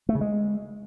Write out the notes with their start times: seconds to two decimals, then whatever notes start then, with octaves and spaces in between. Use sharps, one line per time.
0.09 A3
0.15 C#3
0.21 G#3